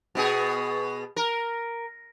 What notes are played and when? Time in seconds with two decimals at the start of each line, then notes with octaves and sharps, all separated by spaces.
0.15 B2 B3 G#4
1.16 A#4